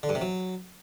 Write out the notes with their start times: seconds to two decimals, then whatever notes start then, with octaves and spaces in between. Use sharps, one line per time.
0.03 D3
0.09 G2
0.15 C3
0.21 F#3